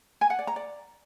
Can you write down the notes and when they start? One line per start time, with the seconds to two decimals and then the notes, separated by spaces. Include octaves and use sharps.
0.21 G#5
0.30 F#5
0.39 D5
0.47 A#5
0.56 D5